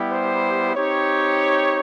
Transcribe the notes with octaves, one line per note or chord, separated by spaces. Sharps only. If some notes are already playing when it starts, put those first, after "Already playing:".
Already playing: G3 B3 E4 G4
C5
C4 D#4 G4 C#5